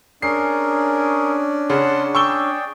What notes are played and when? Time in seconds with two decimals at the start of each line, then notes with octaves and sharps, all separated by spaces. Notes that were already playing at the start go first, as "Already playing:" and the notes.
0.22 C#4 D4 G#4 A#4 C7
1.70 C#3 F#5 A5 C6
2.15 G#4 D5 G5 C#6 E6 G7